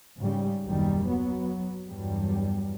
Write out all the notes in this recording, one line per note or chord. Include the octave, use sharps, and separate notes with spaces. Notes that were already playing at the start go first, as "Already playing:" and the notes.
G#2 C#3 G3
F#1 D#2 B2 D#3 G3
F#3 B3
E2 G2 F#3 G3